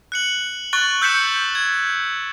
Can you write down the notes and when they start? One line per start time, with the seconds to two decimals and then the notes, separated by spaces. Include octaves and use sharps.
0.12 F#6 C#7 F#7
0.73 C#6 F#6 A6 F#7 G7
1.01 E6 G6 B6 C#7 E7
1.27 G6
1.55 G#6